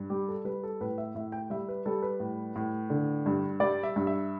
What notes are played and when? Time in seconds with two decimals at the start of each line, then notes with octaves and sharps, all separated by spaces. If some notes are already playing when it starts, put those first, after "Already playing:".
Already playing: G2
0.10 G3 G4
0.28 A4
0.45 G3 B4
0.63 A4
0.81 A2 B4
0.98 E5
1.15 A2 E5
1.32 G5
1.50 G3 E5
1.69 B4
1.85 G3 A4
2.02 B4
2.20 A2
2.56 A2
2.90 D3
3.26 G2
3.60 G3 D5
3.83 E5
3.96 G2
4.07 E5